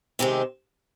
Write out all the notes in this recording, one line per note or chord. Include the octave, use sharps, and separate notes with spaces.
C3 D#3 G#3 C4 G4